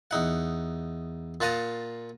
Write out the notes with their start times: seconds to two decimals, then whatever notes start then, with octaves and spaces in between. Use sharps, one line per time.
0.11 E2 D#4 F#5
1.41 A#2 F4 F#5 A5 A#5 D#6